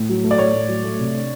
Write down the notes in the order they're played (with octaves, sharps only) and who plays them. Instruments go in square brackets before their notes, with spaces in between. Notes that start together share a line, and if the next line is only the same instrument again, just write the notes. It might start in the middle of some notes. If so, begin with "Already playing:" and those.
Already playing: [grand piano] A2
F#3
A3
[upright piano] D5
[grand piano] A2 [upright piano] C#5
[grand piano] A2
F#3
A3
C3
D4